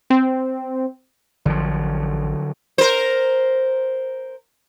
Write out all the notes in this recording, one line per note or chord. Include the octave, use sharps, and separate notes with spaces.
C4
A1 D3 F3 F#3
A#4 C5